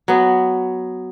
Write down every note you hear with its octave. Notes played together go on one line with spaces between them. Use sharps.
F#3 B3